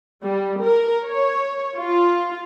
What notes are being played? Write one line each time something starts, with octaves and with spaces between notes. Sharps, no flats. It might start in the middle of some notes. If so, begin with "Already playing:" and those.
G3
A#4
C#5
F4